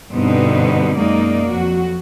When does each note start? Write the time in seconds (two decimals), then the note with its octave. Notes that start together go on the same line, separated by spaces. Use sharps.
0.11 G2 B2 D3 B3 C4 D#4
0.97 F#2 G#3 A#3 D#4 D5
1.48 F2 F#3 F#4